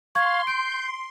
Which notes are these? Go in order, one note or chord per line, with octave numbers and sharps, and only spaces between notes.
F5 C6 C#6 G#6
G6 D7